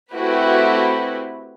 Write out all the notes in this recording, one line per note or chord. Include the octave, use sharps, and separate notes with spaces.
A3 C4 E4 F#4 G4 B4